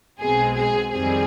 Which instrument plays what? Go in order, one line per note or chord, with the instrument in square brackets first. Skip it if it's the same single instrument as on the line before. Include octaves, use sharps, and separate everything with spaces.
[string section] B1 B2 G#3 C4 G#4
G#4
F2 D#3 G3 C4 G#4